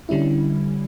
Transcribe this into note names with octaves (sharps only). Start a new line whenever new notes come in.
D3 G3 C#4 E4